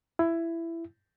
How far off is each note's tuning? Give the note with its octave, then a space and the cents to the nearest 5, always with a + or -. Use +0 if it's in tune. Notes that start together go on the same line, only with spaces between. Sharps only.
E4 +15